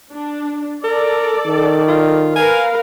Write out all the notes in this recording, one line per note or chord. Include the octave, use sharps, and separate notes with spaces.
D4
A4 A#4 D5
D#3
F4
A#4 B4 F5 G#5